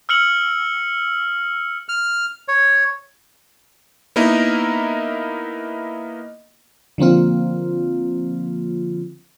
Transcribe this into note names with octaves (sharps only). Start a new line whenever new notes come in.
E6 F6 C#7 F#7
F6
C#5
A#3 B3 D#4 E4 A#4 D#5
D3 F3 A#3 C4 F4